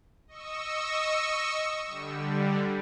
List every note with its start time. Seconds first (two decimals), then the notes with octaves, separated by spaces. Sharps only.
0.27 D#5 C#6 E6
1.87 D3 G3